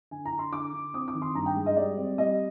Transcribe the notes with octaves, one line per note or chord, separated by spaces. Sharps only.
D3 G#5
A#5
D3
C6
D3 D6
D3
C4 D#6
D6
D#3
C6
G2 A#5
G5
G#3
D#5
G3 D5
C4
G3 D#5